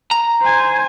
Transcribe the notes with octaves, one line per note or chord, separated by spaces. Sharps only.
A#5
C5 G#5